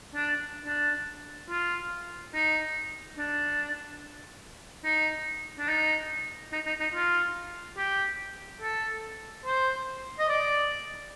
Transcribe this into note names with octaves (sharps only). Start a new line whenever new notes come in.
D4
D4
F4
D#4
D4
D#4
D4
D#4
D#4
D#4
D#4
F4
G4
A4
C5
D#5
D5